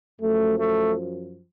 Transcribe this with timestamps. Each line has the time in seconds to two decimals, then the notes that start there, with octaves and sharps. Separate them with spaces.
0.20 F#2 F3 A3
0.57 A3